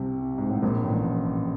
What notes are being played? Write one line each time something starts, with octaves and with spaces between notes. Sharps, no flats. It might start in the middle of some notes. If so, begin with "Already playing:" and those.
Already playing: C2 C3
G#2
A2
A#1 A#2
A1 A2